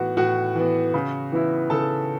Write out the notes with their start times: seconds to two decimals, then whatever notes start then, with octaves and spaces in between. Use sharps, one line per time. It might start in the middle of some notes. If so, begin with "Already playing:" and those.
Already playing: A2 E3 B3 F#4 F#5
0.17 A2 F#4 F#5
0.55 E3 B3
0.94 C#3
1.32 E3 B3 E4
1.70 C#3 A4 A5